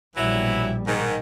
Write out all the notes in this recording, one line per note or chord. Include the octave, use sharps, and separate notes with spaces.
A#1 B2 E3 F#3 G3 E4
G#2 D#3